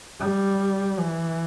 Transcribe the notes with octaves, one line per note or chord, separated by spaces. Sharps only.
G3
E3